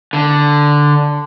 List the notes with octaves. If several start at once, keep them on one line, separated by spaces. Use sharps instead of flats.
D3